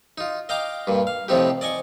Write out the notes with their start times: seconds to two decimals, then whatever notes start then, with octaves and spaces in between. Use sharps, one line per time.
0.18 D#4 F4
0.49 D#5 F5 G5 A#5 D6
0.87 G2 A#2
1.07 F5
1.28 A2 C3 F3 C4 D#4 G4
1.61 D5 D#5 G#5 C#6